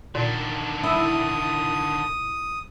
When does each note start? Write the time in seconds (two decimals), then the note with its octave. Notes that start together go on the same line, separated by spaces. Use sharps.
0.15 A#2 D3 D#3
0.83 E4 D#6